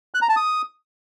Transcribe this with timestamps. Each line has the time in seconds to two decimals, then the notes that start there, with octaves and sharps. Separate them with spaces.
0.15 F#6
0.22 A#5
0.29 A5
0.36 D#6